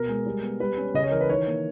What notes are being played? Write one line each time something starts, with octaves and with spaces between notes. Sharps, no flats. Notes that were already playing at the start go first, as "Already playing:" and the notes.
Already playing: B2 A#4
G#3
G3
B3
G3 B4
C#4
C#3 D#5
C#5
E3 A#4
B4
D#3 C#5
A#3